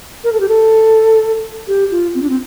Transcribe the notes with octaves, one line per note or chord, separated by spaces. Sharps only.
A#4
A4
G4
A4
G4
F4
C4
D4
C4